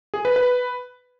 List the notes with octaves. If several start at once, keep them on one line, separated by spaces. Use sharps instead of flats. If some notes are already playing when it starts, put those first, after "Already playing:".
G#4
B4
B4